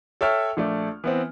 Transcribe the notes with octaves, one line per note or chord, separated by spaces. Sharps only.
A4 C#5 E5 G5 F6
A#1 A3 D5
E3 B3 C4